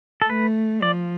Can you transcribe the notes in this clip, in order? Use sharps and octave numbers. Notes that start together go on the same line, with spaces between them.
A4
A3 B4
F3 D5